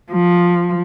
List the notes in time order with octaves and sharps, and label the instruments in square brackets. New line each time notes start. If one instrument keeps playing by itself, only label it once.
[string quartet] F3